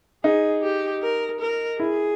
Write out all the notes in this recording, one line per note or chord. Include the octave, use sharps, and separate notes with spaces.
D#4 G#4
G4
A#4
A#4
E4 G#4